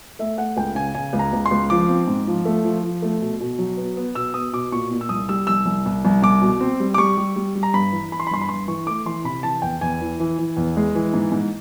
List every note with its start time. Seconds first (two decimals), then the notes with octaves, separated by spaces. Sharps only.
0.19 A3 E5
0.38 A3 F#5
0.57 C#2 G5
0.75 C#3 G#5
0.95 C#3 G#5
1.13 C#2
1.19 A#5
1.33 C#2
1.46 C6
1.51 C#2
1.70 F3 D6
1.89 C4
2.08 G#2
2.27 F3
2.45 A3
2.64 F3
2.83 F3
3.02 A3
3.21 B2
3.40 B2
3.59 F#3
3.77 B3
3.97 B3
4.15 B2 E6
4.34 B3 D#6
4.53 B2 D6
4.72 A#2 C#6
4.91 A#2
5.01 E6
5.09 C2 D#6
5.29 G3 E6
5.47 C2 E6
5.66 C2
5.86 C2
6.05 C2
6.23 C2 D6
6.42 B2
6.60 C4
6.80 G3
6.94 D6
6.98 G3 C#6
7.17 G3
7.36 G3
7.55 G3
7.63 A#5
7.74 G2 B5
7.92 E3
8.12 E3 B5
8.20 C6
8.27 B5
8.31 G2 C6
8.41 B5
8.49 G2 C6
8.68 E3 C#6
8.87 A3 D6
9.06 E3 C6
9.24 C3 B5
9.43 E3 A5
9.62 E2 G5
9.81 E2 G#5
10.01 E3
10.20 E3
10.39 E3
10.57 E2
10.76 G#3
10.95 E3
11.14 G#2
11.32 G#2